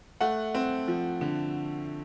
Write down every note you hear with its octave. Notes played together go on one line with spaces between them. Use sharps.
A3 F#5
C4
F3
D3